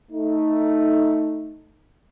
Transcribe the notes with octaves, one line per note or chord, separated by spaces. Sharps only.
A3 D#4